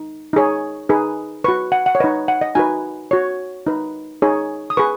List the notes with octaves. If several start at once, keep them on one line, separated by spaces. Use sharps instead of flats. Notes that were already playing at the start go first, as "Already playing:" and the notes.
Already playing: D#4
D#4 G#4 C#5
D#4 G#4 B4
F#4 B4 C#6
F#5
F#5
C#5
D#4 B4 D#5
F#5
D#5
D#4 F#4 B4 G#5
F#4 C#5
D#4 B4
D#4 G#4 C#5
D#6
G#4 B4 C#6